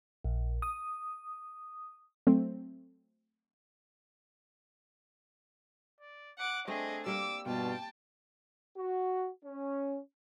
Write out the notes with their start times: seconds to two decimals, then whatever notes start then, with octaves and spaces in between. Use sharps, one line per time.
0.24 A#1
0.62 D#6
2.27 F#3 A3 C4
6.01 D5
6.38 F#5 D6 F#6
6.68 A3 C4 D4 G#4 D#5
7.06 G3 A#3 D6 E6
7.46 G2 B2 F4 G5 A5
8.77 F#4
9.45 C#4